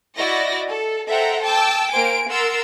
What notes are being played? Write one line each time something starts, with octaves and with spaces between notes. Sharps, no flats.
E4 F#4 D5 D#5 A#6
A4
A4 C5 E5 F#5 G5 A#5
G5 A5 D6 E6
A#3 C5 G#5 D7
A#4 F#5 C6 E6 A6 D7